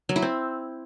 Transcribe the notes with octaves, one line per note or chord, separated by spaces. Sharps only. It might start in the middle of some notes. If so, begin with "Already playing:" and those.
F#3
E4
C4